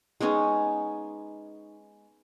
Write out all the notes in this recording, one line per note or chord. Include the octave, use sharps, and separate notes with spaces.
G#3 B3 C#4 D#4